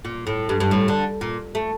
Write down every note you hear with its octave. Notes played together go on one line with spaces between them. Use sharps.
A#2
A2
G2
G2
A2
D3
A#2
A3